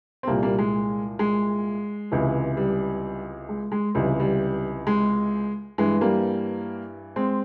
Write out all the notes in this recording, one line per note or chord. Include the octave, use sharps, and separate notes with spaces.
C4
C2 A#2 G3 A#3
G3 A#3
G#3
G#3
C#2 C3 E3
G3
G#3
G#3
C#2 C3 E3 G3
G3
G#3
G2 E3 G#3
G3 A#3
G#3 C4